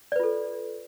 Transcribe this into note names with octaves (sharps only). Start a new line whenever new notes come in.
F4 A4 B4 D5